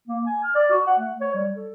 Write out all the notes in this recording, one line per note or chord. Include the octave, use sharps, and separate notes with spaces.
A#3
G#5
F6
D5
F#4
F#5
A3
C#5
G3
A4